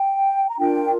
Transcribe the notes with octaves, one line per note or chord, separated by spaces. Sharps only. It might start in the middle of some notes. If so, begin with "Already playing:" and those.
Already playing: G5
A#5
D4 F4 A#4 G5